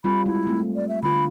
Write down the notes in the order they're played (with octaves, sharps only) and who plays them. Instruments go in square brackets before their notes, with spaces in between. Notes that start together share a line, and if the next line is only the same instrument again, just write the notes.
[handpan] G3 C4 F4 [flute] B5
[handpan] G#3 [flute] E4
[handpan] A3 C4
[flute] D5
E5
[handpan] D3 F4 [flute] B5